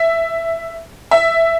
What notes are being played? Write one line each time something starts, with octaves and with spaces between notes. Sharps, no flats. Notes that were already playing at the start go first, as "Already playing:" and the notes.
Already playing: E5
E5